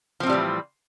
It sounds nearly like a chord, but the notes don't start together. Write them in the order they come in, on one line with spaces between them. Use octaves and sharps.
F3 C4 A2 G3 E3